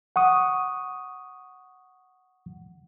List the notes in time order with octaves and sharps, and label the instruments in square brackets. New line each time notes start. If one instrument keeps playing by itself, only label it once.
[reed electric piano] F#5 C#6 D#6